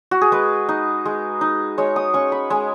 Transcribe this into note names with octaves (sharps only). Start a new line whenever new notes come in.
F#4
G#4
G#3 B4
D#4
G#3
D#4
G#3 C#5
D#6
C#4 C#6
B5
G#3 G#5